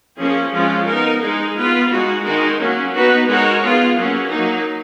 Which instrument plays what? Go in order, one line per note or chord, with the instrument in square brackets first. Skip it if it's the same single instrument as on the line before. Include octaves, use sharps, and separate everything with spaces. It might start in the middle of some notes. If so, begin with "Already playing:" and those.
[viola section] F3 A#3 C#4 G#4
F3 G#3 C#4 F4
B3 D#4 A#4
G#3 D#4 G#4
B3 F4 B4
G#3 D#4 F#4
D#3 G#3 D#4 F#4 A#4
F#3 A#3 C#4
B3 D#4 F#4 B4
G#3 D#4 F#4 A#4 C#5
B3 F4 G#4
F#3 A#3 C#4
F#3 A#3 D#4